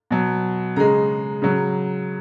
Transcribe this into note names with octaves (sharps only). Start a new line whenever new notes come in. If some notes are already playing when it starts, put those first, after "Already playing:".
B2 F#3
C#3 G#3 A#5
C#3 F#3